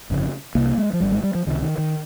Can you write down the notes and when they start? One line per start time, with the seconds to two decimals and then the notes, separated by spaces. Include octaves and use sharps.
0.10 G1 F2 C#3
0.55 C2 C3 A#3
0.78 G#3
0.93 F3
1.00 G#1 G2 G3
1.12 G#3
1.23 G3
1.35 F3
1.47 C#2 C3 D#3
1.62 D#3
1.78 D#3